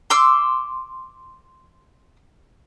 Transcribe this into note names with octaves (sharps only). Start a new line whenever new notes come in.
C6 D6 E6